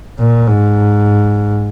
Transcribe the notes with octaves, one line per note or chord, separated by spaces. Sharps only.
A#2
G#2